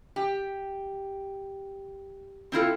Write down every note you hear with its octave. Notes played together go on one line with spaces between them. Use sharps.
G4
C4 E4 F4 A4